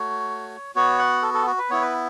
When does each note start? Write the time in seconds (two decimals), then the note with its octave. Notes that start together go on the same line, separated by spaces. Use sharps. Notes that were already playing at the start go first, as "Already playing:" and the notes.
Already playing: A3 F#4 C#5
0.75 B3 F#4 C#5
0.98 F#5
1.22 A4
1.34 A4
1.47 F#4
1.58 B4
1.70 B3 E4 C#5
1.81 B4